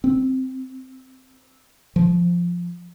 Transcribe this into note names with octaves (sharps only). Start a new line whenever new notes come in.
C4
F3